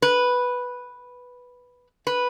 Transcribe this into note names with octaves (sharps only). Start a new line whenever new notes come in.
B4
B4